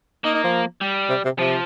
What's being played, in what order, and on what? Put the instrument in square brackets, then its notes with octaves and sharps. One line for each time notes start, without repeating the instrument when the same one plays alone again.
[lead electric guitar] A#3 [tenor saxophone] D#4
[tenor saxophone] D#4
F3
[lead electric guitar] G3
[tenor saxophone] C3
C3
[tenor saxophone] C3 [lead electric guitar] F3